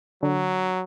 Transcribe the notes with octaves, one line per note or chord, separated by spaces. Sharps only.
D3 F#3